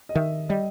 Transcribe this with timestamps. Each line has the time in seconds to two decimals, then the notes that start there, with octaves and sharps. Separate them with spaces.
0.09 D#5
0.15 D#3 E5
0.49 G3 D#5